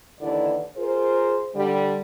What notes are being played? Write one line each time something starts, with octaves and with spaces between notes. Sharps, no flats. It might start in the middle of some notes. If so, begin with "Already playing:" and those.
D#2 D3 E3 D4 E4 D5
F4 G#4 A#4 C5
D3 G3